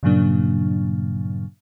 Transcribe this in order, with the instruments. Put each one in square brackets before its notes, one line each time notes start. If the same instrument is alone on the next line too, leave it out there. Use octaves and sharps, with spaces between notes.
[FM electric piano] G2 A#2 C#3 F#3 A#3 D4